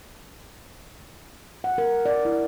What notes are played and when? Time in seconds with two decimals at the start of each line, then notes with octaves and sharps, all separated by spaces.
1.64 F#5
1.78 A#4
2.06 D5
2.25 E4